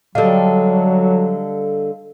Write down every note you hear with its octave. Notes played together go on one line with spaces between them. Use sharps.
D3 F#3 G3 A4 D#5 F5